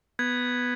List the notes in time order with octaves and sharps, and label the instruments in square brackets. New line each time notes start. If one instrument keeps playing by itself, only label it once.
[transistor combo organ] B3 [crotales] G#6